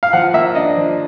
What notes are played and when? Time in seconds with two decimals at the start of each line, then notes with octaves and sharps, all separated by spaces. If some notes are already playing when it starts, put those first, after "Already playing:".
0.03 F5
0.13 F3 F#5
0.33 A#3 E5
0.55 D4 D#5
0.77 F3